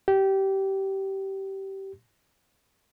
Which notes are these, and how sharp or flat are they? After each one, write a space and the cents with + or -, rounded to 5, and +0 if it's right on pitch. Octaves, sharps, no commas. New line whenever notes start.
G4 -20